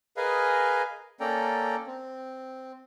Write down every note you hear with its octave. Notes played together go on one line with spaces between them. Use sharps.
G#4 A#4 B4 D#5 F5 G#5
A#3 C#4 A4 D5 G5 A#5
C4